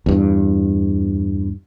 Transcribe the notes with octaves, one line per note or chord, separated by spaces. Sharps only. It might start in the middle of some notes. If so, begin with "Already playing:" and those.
E2 G2